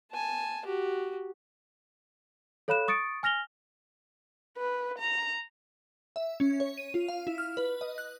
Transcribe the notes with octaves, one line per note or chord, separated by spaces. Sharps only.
G#5 A5
F#4 G4
A4 C#5 F5 B5 F#6 E7
C#6 D#6 A6 C#7 D7
G#5 F6 A#6 F7 G7
B4
A#5
E5
C#4
C#5
D#7
F4
F5
E4
F6
B4
D#5
F#6